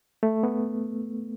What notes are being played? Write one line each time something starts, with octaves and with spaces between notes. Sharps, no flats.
A3
B3